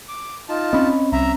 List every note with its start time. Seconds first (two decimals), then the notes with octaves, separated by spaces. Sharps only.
0.09 D6
0.49 D#4 F4 A5
0.73 C4 C#4 D#5 B5
1.12 C2 E5 A#5